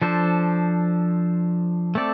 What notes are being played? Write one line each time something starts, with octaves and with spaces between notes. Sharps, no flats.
F3 D4 A4 C5
A3 C4 A4 D5